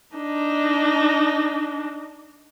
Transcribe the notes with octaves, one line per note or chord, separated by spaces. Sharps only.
D4 D#4